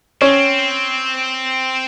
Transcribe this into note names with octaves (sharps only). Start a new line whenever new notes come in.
C4 C#4